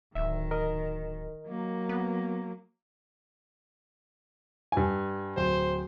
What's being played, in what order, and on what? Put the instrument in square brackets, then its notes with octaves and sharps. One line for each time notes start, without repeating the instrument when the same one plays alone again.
[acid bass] D1 [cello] D#3 [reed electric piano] E5
[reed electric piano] A#4 D#5
[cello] F#3 A#3
[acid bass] B3
[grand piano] G2 G#5
[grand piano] D1 [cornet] C5